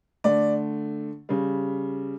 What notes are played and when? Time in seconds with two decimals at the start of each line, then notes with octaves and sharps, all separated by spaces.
0.24 D3 A3 D5
1.29 C#3 G3